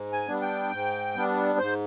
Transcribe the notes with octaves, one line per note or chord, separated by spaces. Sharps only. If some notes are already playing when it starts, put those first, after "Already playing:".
Already playing: G#2
G#5
G3 B3 D4
G5
G#2
G3 B3 D4
G#2 C5